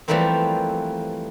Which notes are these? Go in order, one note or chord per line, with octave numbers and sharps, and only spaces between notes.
E3 F3 G3 A3 A#3 C4